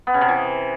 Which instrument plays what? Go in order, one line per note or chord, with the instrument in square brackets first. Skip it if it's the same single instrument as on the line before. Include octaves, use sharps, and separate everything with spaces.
[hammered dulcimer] B3
C#3
C3
E3